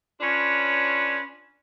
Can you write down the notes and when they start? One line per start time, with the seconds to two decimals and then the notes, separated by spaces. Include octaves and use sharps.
0.21 C#4 D4 F4 B4 C#5